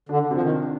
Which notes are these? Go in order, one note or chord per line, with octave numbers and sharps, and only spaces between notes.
D3 D4
C3 F3
D#3
D4